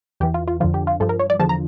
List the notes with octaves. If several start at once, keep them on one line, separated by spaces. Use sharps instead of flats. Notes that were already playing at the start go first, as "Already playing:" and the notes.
E2 E3 G4
F4
F4
F2 D3 F3 F4
G4
F4
G2 F3 A4
A#4
C#5
D5
E2 D3 F3 A5
A#5